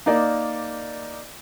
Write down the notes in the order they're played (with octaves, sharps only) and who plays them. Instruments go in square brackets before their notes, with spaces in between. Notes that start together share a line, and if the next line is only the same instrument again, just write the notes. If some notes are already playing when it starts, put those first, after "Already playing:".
[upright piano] A#3 D#4 A#4 D5